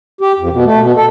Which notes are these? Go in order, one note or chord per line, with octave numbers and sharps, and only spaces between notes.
G4
F2
B2
A3
B2
A4